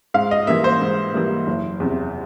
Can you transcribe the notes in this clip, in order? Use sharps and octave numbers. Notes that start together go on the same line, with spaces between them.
G#2 F5
D#5
E3 G3 A#3 E5
C5
G#2
E3 G3 A#3
F#1
E2 C3